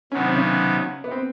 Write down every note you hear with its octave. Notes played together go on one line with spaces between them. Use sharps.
C3 D#3 F#3 B3 C#4
C4
C#3 C#4
B3
C4